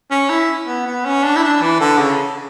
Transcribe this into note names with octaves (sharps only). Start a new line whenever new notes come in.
C#4
E4
B3
B3
C#4
D4
E4
D4
E3
D3
C#3